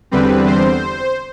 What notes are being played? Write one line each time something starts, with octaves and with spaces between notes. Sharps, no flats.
E2 D3 G3 C4 B4
C5